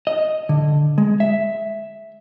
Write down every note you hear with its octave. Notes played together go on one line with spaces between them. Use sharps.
D#5
D3
G#3
E5